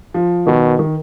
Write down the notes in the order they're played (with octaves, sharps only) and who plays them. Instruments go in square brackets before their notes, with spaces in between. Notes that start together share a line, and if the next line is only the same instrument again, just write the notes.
[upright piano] F3
[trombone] B2 [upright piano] D#3
[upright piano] D#3